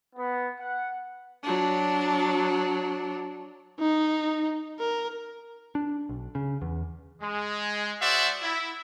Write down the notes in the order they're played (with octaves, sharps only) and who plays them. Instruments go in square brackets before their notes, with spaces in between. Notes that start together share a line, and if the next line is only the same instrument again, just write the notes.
[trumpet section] B3
F#5
[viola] F#3 D4
[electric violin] D#4
A#4
[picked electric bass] D4
B1
C#3
E2
[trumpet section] G#3
F#4 G#4 C5 D5 E5 F#5
E4